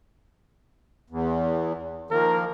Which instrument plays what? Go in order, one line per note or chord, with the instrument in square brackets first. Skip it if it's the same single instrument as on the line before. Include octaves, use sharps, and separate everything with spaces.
[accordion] E2
[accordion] D#3 F3 A#3 [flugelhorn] A#4